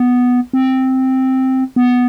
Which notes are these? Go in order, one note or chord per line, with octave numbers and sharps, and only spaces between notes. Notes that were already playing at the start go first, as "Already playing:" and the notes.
Already playing: B3
C4
B3